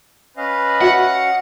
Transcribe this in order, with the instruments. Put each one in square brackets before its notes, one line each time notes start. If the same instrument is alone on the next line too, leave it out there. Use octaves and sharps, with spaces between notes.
[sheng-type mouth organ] C#4 D#5 F5 [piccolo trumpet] B4
[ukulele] F#4 E5 [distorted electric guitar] F#5